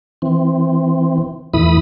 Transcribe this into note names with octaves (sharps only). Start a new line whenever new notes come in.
E3 C4
E2 A2 E3 E4 B5 D#6